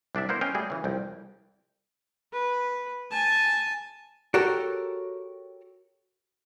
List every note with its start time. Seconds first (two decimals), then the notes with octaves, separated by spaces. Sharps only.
0.15 C2 D4 D5 E5
0.29 A#3 B3 E4 A#4 C5
0.41 C#4 B4 D#5 F5 G5
0.55 G3 A3 F#4 G#4
0.70 C#3 E3
0.84 C2 F2 G5
2.33 B4
3.11 G#5 A5
4.34 F#4 G4 A4 A#4 C#5